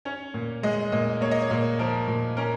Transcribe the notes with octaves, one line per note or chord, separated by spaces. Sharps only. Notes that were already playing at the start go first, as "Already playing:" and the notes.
C#4 C#5
A#2
G#3 D#5
A#2 D#5
A#3 C#5
D#5
C#5
A#2
F3 A#4
A#2
C#4 A#4